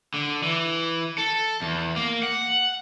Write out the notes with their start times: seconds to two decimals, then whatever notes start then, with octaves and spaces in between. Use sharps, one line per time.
0.14 D3
0.43 E3
1.18 A4
1.62 E2
1.96 A#3
2.23 F#5